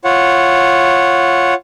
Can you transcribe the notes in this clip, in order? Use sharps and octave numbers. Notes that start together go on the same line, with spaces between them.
F4 C#5 F#5